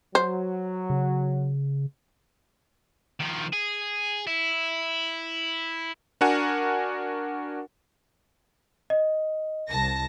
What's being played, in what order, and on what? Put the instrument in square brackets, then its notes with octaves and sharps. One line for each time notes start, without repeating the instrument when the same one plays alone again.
[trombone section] F#3 [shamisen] C5
[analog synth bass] C#3
[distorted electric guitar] D#3 F3
G#4
E4
[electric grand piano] D4 F#4 A#4 F#5 G#5
[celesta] D#5
[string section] C2 A5 A#6